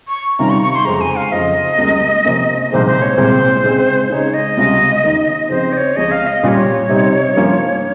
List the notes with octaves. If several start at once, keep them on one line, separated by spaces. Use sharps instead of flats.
C#6
C3 D#3 G3 C#4 F4 A#5
C#6
C#6
C6
F2 C#3 G#3 A#5
G#5
F5
F2 C#3 F3 D#5
C#2 C#3 G3 A#3
C3 F3 A#3 C#4
C2 A#2 F3 G#3 D#4 C5
C5
C#5
C2 A#2 G#3 C4 C5
C#3 G#3 C4
C#3 G#3 D#4 C#5
D#5
C#2 C3 G3 C#4 F4
D#2 D#3 A#3
C#3 F3 C4 D#4 C5
D#5
C#5
C#2 C#3 F3 G#3 D#5
F5
D#5
A#2 G3 C#4 F4 C#5 D#5
C3 G3 C4 D#4
G2 F3 A#3 C#4 F4